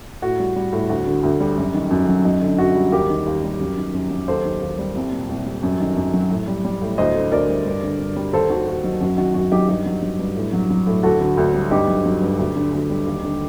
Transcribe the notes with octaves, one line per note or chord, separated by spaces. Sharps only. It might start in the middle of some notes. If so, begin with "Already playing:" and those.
A2 F#4
G3
G3
A2
D2 F#4
D3
D2
G3
F#2
D#3
F#2
F#3
F#2 D#4
D3
F#2 F#4
G3
D#2 G4 A#4
D#3
D#2
G3
F#2
D#3
F#2
F#3
D#2 A4 C5
D#3
D#2
G3
C2
A#2
C2
G3
F#2
D#3
F#2
F#3
A2
G3
G3
A2
D2 C5 D#5
D3
D2 A#4 D5
G3
G2
D3
G2
G3
D#2 A4 C5
D#3 F#4 A4
D#2 F#4
F#3 D#4
F#2 F#4
D#3 F#4
F#2 F#4
F#3 D#4 G4
G2 D#4 G4
F#3
F#3
G2
A2
F#3
F#3
A2
D2 F#4 A4
D3
D2
G3
G2 D#4 G4
F#3
F#3
G2
D2
D3
D2
G3
D#2
D3